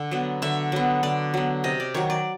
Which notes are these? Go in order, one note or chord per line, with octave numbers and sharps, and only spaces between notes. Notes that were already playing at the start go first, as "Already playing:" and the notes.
Already playing: D3
F#3 B3
D3 E5
F#3 B3
D3 D5
F#3 B3
C3 D#5
D5
D#3 F#3 C#5
D5